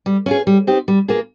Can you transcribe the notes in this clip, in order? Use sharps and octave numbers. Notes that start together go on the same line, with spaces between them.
G3
C#4 F4 G#4
G3
C4 D#4 G4
G3
A#3 F4 G#4